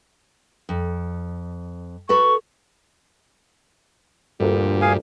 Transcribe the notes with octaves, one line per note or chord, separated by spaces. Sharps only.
F2
F#4 A4 B4 C#6
D2 G2 A#2
G#4 F5 G#5